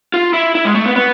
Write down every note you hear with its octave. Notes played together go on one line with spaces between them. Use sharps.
F4
E4
E4
G#3
A3
B3
B3